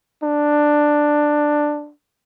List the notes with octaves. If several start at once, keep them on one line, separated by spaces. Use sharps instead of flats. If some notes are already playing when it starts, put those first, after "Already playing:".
D4